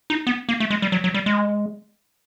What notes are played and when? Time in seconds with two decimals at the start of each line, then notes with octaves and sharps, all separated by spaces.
0.10 D#4
0.27 B3
0.49 A#3
0.60 A3
0.70 G#3
0.82 G3
0.92 F#3
1.04 F#3
1.14 G3
1.26 G#3